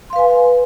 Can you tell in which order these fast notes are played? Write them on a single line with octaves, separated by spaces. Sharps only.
C6 F5 B4 G#5